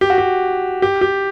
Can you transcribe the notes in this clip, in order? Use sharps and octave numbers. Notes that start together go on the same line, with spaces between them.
G4
F#4
G4
G4
G4